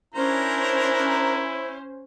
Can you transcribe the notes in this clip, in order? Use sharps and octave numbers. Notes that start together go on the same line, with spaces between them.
C#4 D4 E4 A#4 C5 A#5